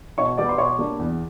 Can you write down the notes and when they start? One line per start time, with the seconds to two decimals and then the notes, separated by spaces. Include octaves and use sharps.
0.18 B2 C#5 C#6
0.38 G3 B3 D5 D6
0.49 C6
0.58 B2 C#5 C#6
0.79 G3 A#3 D4
0.99 E2